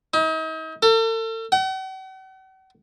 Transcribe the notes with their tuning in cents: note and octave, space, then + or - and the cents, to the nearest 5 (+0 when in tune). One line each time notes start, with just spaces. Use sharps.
D#4 +40
A4 +40
F#5 +45